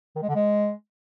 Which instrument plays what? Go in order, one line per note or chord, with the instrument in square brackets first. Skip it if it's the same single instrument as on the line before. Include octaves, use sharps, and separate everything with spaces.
[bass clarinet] D#3
G#3
D3
G#3